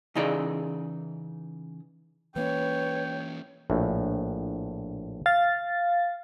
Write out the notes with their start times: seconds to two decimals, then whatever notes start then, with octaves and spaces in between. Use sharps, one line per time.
0.15 C#3 E3 D#4 G#4 D5
2.36 E3 A#3 C#4 B4 C#5 G5
3.70 A#1 A2
5.26 F5 A6